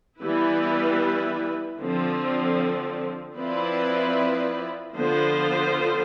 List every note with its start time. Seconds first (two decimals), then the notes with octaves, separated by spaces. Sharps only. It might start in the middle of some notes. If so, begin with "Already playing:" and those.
0.21 E3 G3 B3 E4 B4
1.79 D3 F3 C4
3.37 F3 C4 E4 B4 D5
4.95 D3 F3 B3 F4 C5